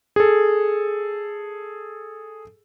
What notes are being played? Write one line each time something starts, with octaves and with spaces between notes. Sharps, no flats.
G#4 A4